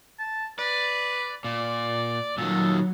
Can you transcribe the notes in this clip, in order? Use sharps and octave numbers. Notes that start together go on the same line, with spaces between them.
A5
B4 D5
A#2 D5
A#2 D#3 F#3 A4